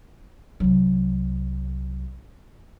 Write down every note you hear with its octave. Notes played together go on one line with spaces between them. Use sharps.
C2 F#3